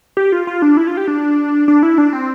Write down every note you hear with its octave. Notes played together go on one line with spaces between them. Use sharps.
G4
F4
F4
D4
E4
F4
G4
D4
D4
E4
D4
C4